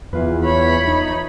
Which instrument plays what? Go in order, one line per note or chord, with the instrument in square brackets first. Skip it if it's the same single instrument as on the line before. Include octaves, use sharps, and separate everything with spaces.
[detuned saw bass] E2 [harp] E3 F4 B4
[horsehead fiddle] C#5 B5
[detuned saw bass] D#4